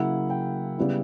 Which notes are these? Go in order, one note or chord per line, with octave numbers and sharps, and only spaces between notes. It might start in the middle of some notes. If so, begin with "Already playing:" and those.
Already playing: C#3 F#3 A#3 E4 F#5
G5
C#3 G3 B3 E4